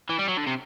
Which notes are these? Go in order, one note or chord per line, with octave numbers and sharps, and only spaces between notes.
E3
G3
F#3
D3
C3